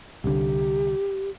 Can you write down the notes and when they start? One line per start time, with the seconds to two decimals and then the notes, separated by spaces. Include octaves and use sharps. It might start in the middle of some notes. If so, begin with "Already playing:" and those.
0.24 C2 D3 G4